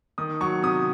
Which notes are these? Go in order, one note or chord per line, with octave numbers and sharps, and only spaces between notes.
D#3 D#6
F#3 C#6
C3 D#6